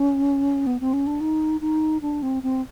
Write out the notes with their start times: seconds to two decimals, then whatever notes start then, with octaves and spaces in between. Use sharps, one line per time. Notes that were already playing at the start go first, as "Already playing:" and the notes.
Already playing: C#4
0.67 B3
0.80 C4
0.93 C#4
1.07 D4
1.21 D#4
1.61 D#4
2.02 D4
2.22 C4
2.43 C4